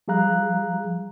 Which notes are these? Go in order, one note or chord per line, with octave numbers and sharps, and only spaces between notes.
F3 G3 G#4 F5 A#5 F#6